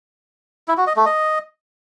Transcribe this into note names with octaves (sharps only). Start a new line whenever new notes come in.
E4
F#4
D#5
A3
D#5